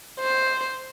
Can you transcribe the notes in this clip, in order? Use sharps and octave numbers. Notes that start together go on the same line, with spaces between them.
C5